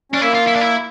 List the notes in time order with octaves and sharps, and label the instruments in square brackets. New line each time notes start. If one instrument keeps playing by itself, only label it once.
[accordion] C#4 [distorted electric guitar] D4
[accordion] A#3 [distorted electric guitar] E4
[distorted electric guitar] F4
E4
D4
E4